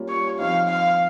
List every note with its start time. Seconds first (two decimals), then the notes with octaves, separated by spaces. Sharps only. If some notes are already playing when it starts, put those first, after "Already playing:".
Already playing: G3 A#3 C#4 F4
0.09 C#5
0.39 F3 C4 D#4 F5
0.69 F5